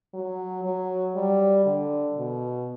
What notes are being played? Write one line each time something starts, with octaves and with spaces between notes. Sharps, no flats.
F#3
F#3
G3
D3
B2